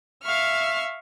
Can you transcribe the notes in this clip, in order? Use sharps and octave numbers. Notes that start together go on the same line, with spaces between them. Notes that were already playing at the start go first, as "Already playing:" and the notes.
E5 F5 C#6 F6